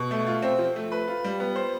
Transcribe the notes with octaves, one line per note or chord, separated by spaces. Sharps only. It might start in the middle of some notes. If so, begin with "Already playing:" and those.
Already playing: B2
A3
F4
C4
F3
A3
B4
F4
G3
B3
C5